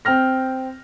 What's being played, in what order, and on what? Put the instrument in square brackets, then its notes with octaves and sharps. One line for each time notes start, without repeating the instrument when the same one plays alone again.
[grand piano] C4 G5 F6 A#6